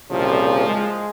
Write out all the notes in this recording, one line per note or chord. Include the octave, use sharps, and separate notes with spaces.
C2 A#2 C#3 F3
G#3